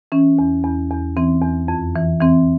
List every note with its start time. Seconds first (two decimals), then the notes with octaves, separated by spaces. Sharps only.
0.12 E3 C#4
0.39 E2
0.64 E2
0.91 E2
1.17 E3 C4
1.42 E2
1.68 F2
1.96 E3
2.21 E3 C4